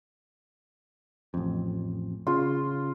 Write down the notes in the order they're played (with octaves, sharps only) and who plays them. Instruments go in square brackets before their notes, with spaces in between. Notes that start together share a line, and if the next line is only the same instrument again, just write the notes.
[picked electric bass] A1 F2
[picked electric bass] C#3 [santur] F4 C6